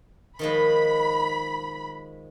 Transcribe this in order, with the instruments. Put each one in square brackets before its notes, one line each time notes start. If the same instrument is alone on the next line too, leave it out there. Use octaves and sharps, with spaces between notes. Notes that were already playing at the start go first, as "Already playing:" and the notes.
[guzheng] D#3 F3 G#3 [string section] B5